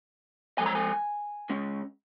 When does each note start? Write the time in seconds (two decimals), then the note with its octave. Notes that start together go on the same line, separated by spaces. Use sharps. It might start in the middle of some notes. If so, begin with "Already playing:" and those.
0.58 F3 G#3 C4 G#5
0.66 A#5
0.75 G#5
1.50 C#3 G#3 C#4